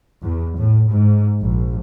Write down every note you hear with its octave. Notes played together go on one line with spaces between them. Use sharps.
E2
A2
G#2
A#1